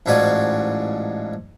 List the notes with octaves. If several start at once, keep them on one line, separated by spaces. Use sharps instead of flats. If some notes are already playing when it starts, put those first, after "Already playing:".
A1 G#2 F3 F#4 D5 G#5